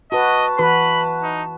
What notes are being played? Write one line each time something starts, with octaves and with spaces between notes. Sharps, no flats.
F#4 B4 D#5 A5
E3 F#4 B4 B5
D#4